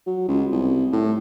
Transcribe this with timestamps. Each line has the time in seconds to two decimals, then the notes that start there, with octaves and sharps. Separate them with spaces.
0.06 F#3
0.28 C#2
0.51 C2
0.92 A2